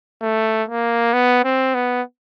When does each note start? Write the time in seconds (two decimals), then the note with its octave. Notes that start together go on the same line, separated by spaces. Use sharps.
0.22 A3
0.69 A#3
1.13 B3
1.44 C4
1.74 B3